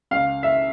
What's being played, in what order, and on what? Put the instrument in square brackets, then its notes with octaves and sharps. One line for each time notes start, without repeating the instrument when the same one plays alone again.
[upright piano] C#2 F5
E5